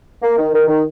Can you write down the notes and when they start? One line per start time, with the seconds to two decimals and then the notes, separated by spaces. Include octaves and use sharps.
0.23 A#3
0.38 D#3
0.53 D#3
0.68 D#3